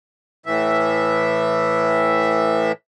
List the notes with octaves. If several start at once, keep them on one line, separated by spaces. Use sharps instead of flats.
A2 E3 E5